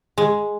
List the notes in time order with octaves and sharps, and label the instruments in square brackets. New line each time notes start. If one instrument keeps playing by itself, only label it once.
[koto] G#3